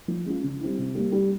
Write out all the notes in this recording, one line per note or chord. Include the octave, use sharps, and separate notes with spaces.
F3
G#3 C#4 F4
C#3
G3 C4 E4
C3
G3 A#3
G3